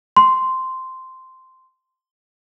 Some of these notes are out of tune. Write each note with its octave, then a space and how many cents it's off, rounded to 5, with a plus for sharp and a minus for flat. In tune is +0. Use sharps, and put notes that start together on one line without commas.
C6 -5